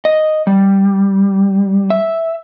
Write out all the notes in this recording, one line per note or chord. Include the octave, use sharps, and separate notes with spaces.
D#5
G3
E5